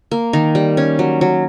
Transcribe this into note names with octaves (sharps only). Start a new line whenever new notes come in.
A#3
D#3
G3
C#4
F#3
F#3